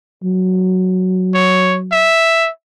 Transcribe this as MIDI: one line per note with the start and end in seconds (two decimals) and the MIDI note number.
0.24 2.15 54
1.35 1.78 73
1.92 2.49 76